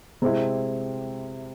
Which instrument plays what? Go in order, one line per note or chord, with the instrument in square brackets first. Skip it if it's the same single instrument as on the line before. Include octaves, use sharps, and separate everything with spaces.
[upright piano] C3 G#3 C4 E4